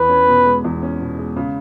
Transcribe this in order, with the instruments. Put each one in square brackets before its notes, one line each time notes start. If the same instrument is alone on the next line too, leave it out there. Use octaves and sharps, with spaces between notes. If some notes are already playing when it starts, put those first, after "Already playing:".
Already playing: [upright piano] E2 [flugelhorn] B4
[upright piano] C#4
B2
G#3
E2
C#4
B2
G#3
C#3